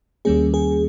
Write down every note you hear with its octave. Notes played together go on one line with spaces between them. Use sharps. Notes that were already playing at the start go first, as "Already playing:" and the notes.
D#2 D#3 G3 A#3 C#4 G#4
G#4